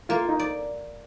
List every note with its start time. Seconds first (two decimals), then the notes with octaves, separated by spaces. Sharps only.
0.09 A#3 F4
0.29 D#4
0.39 D5